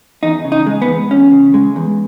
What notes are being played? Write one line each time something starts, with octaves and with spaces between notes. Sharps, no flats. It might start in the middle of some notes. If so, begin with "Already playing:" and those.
E2 D#4
C#3
D#4
G#3
B3
E2
E2 C#4
C#3
G#3
E2